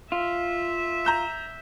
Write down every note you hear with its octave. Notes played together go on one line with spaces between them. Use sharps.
F4 E5
A#5 G6 E7